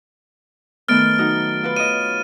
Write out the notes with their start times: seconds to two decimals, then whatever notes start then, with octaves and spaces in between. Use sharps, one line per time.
0.88 D#3 A3 B3 F6 A6 D7
1.19 F#3 D#4 F#4
1.63 F4 F#4 B4
1.76 C#5 D#5 D#7